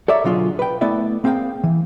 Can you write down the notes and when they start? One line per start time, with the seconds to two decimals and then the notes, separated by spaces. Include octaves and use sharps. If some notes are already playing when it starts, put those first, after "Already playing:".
0.08 A4 C#5 D5 E5 A#5
0.24 B2 D3 F#3 F4 G#4
0.59 B4 G5
0.81 A3 B3 E4 D5 E5
1.24 A#3 C4 G#4 F5 G5
1.64 E3